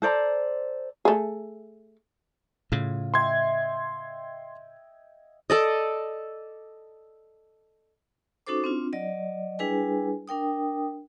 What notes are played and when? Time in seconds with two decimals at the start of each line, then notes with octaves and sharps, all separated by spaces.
0.02 A4 C5 D5 A#5
1.05 A3 G#4
2.72 A2 C#3 F4
3.14 D#5 E5 G5 C6 G#6
5.50 A4 D5 D#5
8.47 C#4 D#4 F#4 A4 C5 D6
8.64 C4 D4 F4
8.93 F#3 D5 D#5
9.59 G3 D4 E4 G#4 B4 G#5
10.28 D4 A#4 G5 D#6